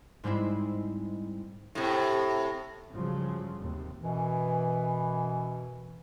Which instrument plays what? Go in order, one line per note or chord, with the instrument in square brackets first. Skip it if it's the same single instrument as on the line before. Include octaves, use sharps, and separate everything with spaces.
[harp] G#2 G3 G#3 C4 E4
[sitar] A2 C3
[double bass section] G2 C#3 F3 F#3
D#2 C3
[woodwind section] F#2 B2 E3